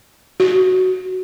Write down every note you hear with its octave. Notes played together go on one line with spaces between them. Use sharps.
F#4